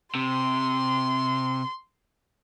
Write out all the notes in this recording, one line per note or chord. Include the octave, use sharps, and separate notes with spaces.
C3 C6